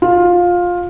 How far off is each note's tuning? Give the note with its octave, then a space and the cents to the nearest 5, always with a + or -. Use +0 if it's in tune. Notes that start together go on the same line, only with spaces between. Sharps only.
F4 +15